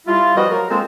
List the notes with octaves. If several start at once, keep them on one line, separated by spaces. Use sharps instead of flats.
G3 E4 F4
F3 G3 F#4 B4 D#5
F#3 F4 A#4
G#3 A#3 C4 F4 A4